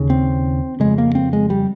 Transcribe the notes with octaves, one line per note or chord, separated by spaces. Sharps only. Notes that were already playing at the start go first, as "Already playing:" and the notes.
Already playing: D#2 C#3
C4
F2 C#3 G#3
A#3
C4
G#3
G3